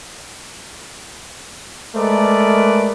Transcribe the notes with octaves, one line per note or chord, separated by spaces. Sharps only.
G#3 A3 A#4 B4 D5